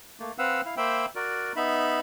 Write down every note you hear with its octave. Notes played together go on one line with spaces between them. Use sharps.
A3 A#3
C4 B4 F5 F#5 E6
E4 F5
A#3 C5 E5 G5 B5 E6
F#4 A#4 D5
B3 D#4 E5 B5